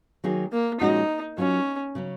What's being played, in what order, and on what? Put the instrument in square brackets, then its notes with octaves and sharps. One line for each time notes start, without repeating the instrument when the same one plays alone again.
[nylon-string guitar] D#3 F#3 A#3 D#4 G#4
[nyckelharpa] A#3
[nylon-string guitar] A#2 F3 G#3 C#4 F#4 [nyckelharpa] D#4
[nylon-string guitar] F#3 A#3 F4 [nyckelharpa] C#4
[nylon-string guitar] C#3 F#3 C#4